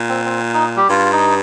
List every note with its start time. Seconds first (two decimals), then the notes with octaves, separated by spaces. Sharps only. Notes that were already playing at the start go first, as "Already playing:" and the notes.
Already playing: A#2
0.09 C4
0.25 C4
0.54 D#4
0.76 G3 G4
0.89 G2 F4
1.13 D#4